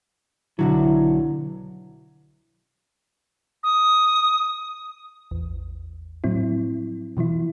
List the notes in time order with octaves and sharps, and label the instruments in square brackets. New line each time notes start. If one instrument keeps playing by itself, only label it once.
[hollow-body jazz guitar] B1 D3 F#3 [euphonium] E4
[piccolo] D#6
[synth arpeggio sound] A1 E2
A2 F3 F#3 C4 E4
B2 E3 F3 E4